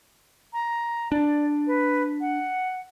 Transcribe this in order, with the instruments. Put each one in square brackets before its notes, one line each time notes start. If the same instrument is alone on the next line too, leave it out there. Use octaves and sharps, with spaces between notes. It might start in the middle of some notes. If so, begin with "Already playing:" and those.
[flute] A#5
[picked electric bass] D4 [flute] D5
[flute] B4
F#5